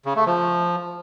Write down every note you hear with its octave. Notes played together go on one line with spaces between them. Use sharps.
C#3
A3
F3